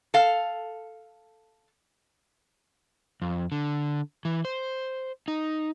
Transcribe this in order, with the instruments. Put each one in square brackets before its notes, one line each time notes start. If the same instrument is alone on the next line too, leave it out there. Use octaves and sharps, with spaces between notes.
[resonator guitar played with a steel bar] A4 F5
[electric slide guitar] F2
D3
E3
C5
D#4